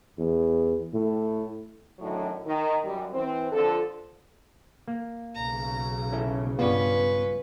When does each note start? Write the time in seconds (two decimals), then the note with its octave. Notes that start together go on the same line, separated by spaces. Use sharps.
0.18 E2
0.94 A2
1.99 F#2 A2 D3 D#3 F#3
2.45 D#3
2.84 F#2 G3
3.13 E3 C4
3.52 D3 F3 F4 A4
4.88 A#3
5.35 B1 C#3 A#5
6.12 C#4 E4 A4
6.59 G2 G3 B3 C#4 F4 B4 D5